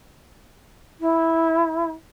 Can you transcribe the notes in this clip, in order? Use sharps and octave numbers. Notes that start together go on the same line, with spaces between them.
E4